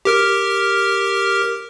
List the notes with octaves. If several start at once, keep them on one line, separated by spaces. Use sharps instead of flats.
G4 A#4 F6